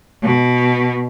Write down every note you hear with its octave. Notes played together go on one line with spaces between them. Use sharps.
B2